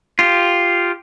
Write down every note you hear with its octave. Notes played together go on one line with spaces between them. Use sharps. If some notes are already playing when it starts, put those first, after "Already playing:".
F4 G4